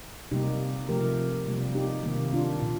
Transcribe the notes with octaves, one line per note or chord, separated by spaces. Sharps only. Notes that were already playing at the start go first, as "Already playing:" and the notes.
C3 G3 A#3 D#4 G4
C3 F3 A3 G4 A#4
C3 G3 A#3
D#4 G4
C3 D#3 A#3
D4 F4
A#2